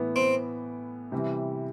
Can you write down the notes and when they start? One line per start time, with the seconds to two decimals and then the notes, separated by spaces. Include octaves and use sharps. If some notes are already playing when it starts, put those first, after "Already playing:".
Already playing: A2 E3 B3
0.16 C4
1.12 C3 E3 G3